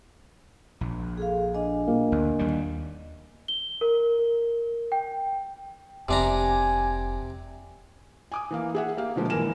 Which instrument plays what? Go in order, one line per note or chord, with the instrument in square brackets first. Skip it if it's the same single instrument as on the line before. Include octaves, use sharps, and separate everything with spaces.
[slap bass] A#1
[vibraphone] G#4 A4 F5
D4 D#5 G#5
[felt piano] A#3
[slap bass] D2
D#2 G3
[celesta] G7
A#4
A#4
G5
[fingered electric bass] F1 F2 [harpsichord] C3 D4 A#5 [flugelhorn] G#5
[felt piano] G#5 D6 D#6
E3 A#3 F5
G#4 E5 F#5
A#3 G4 F5
B2 D3 F3 G#3 A#3
G#1 A#2 E3 A#4 G#5 E7